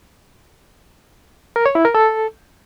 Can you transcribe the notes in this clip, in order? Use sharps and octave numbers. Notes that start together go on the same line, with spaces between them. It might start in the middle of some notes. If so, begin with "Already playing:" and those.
A#4
C#5
E4
A#4
A4